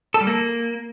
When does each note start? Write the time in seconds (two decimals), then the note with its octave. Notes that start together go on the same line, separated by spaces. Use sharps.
0.14 A4
0.21 G3
0.27 A#3